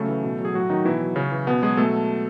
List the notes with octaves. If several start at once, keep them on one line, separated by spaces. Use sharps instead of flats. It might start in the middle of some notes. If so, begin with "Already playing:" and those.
Already playing: C#3 F#3 A3 A4
E3
B2
F#3
G#4
A2 F#3 F#4
D#3 F#3 D#4
B2 E3 E4
F#3
C#3 C#4
E3
B2 B3
F#3 G#3 G#4
B2 A3 A4